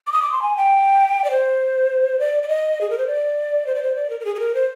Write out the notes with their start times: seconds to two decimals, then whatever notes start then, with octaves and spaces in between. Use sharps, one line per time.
0.07 D6
0.12 D#6
0.22 D6
0.32 C6
0.42 G#5
0.57 G5
1.24 D5
1.31 C5
2.20 D5
2.43 D5
2.48 D#5
2.81 G#4
2.90 A#4
2.98 C5
3.07 D5
3.66 C5
3.75 D5
3.83 C5
3.95 D5
4.10 A#4
4.20 A#4
4.25 G#4
4.35 G#4
4.40 A#4
4.55 C5